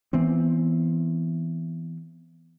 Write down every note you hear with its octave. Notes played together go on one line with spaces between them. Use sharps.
E3 B3 C4